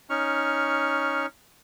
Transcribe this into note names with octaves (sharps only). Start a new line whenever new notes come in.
C#4 D#4 C#6 F6